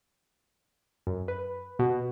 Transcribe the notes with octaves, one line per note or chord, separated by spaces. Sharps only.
F#2
B4
B2